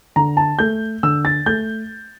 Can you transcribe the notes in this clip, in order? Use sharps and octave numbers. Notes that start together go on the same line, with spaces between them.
D3 A#5
A5
A3 G6
D3 E6
A6
A3 G6